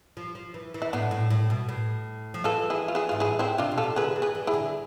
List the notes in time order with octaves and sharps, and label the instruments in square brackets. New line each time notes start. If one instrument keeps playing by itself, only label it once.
[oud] F3
F3
E3
E3
[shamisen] E4
[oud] A2 [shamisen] B3 D4
[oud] A2
A2
B2
A2
F3
[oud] E3 [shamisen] F4 A4
[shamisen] E4 G#4
F4
E4 G#4
[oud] G#2 [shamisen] F4
[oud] A2 [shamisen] E4 G#4
[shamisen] C4 E4
[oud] C3 [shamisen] D4 F4
[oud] B2
[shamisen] F4 A4
[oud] C3
[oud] D3 [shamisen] G#4 B4
[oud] E3
[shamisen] G#4 B4
[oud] E3
[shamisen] E4 G#4
[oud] D3